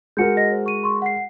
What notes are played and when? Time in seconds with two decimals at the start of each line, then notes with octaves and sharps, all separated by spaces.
0.17 G#3 F#4 A#4 G6 C#7
0.37 D#5 A#6
0.52 C5
0.66 C#6 D#7
0.83 C6 C#6
1.02 F#5 C7